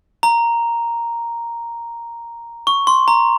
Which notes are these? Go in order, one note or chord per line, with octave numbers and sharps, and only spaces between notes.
A#5
C#6
C6
A#5